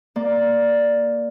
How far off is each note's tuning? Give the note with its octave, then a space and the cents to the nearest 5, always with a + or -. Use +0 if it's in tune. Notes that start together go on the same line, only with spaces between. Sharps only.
A#3 +0 D5 +0